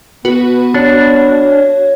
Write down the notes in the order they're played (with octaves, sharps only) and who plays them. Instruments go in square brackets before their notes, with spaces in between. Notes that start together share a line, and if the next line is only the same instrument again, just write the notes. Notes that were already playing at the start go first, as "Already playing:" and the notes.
[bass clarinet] B3 [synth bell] F#4 B4
[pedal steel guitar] D4 [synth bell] F#4 [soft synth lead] C#5